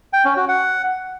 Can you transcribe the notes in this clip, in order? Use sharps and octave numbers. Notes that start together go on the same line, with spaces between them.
G5
C#4
F#4
F#5